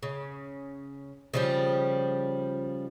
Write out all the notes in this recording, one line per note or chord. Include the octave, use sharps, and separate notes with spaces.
C#3
C#3 F3 G3